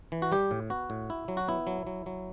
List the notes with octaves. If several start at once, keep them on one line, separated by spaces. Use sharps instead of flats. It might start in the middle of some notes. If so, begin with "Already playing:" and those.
E3
F#4
G3 G4
A2
B3 F#4
A2
E4
F#3
F#4
B3 E4
F#3
F#3
F#3